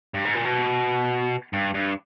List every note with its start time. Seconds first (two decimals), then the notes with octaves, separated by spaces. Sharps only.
0.14 G2
0.25 G#2
0.35 A#2
0.45 B2
1.53 G2
1.74 G2